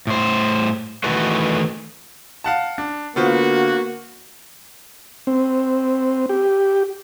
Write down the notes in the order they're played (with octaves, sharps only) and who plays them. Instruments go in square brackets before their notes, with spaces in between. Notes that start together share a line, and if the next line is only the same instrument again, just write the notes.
[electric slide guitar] A2 C5
D#3 E3 A3 F#4 A4 B4
[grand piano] F5 F#5 A5
D4
[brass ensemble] D3 A#3 F#4 [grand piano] B3 F4 C5
[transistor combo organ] C4
G4